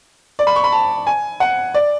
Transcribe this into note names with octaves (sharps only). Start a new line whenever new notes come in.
D5
B5
C#6
B5
A5
G#5
F#5
D5